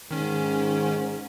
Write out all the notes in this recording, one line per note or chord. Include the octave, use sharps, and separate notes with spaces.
G#2 D#3 C#4